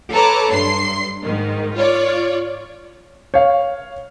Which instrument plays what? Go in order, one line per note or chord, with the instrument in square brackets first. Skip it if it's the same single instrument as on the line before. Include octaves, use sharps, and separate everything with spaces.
[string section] A4 B4 C#5 A5 A#5 D6
G2 C6 C7
G#2 D#3
F4 C#5 D5
[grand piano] C#5 F5